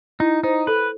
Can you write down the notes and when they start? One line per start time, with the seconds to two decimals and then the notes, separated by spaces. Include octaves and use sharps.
0.20 D#4 E4
0.44 D#4 C5
0.67 A4 B4